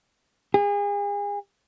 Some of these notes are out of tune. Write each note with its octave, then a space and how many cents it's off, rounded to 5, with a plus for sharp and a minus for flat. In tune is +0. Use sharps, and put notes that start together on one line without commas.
G#4 -35